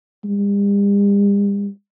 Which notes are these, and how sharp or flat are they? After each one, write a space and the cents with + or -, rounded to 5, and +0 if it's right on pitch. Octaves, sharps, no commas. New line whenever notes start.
G3 +45